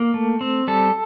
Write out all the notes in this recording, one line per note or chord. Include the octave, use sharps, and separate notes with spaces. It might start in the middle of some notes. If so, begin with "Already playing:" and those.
Already playing: A#3
A3
C4
G3 A4